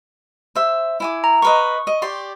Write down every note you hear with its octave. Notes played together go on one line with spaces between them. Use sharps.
C5 E5
E4 G#5 D6
A#5
A#4 B4 D#5 C#6
D#5
G4 D5 C6